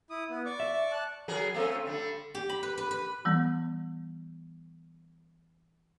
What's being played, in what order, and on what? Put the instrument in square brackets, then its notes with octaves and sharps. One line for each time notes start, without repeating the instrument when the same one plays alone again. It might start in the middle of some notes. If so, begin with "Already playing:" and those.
[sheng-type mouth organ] E4 D#6
B3
D5 C#6 D6
[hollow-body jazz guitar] E5
[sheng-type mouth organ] A5 F#6
[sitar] F#3 G#4 A#4
A3 C4 C#4
D3 G3
[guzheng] G4
B5
B4
B4
B4
[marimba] E3 G3 B3